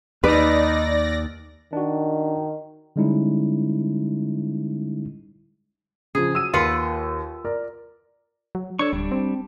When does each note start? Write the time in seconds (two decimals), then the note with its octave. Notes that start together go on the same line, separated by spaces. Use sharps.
0.24 D#2 D#4 B4 D5 A#6
1.73 D#3 D4 F#4
2.96 D3 G3 G#3 C#4 D#4 E4
6.15 C#3 F3 G#4
6.34 F#3 E6 D#7
6.54 D#2 F4 B4 F#5
7.45 A#4 D5
8.55 F#3
8.79 D4 A4 C#5 C#6
8.93 D1 G3 D4
9.11 C4